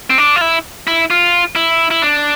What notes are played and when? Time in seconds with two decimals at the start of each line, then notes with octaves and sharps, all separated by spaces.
0.10 C4
0.18 D4
0.36 F4
0.41 E4
0.87 E4
1.10 F4
1.55 E4
1.91 E4
2.02 D4